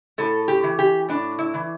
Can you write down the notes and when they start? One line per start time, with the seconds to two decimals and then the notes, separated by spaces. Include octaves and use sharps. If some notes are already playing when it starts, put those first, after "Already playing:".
0.18 A2 A4
0.48 G4
0.64 E3
0.79 G4
1.09 A2 D4
1.39 E4
1.54 E3